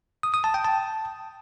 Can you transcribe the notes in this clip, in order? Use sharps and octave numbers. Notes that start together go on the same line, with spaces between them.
D#6
D#6
A5
G5
A5